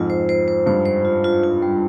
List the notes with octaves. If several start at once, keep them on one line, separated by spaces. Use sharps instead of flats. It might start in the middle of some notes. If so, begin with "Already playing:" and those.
Already playing: F2 G#2 F4
C5
C5
C5
G2 C5
C5
F4
F4
F4
G3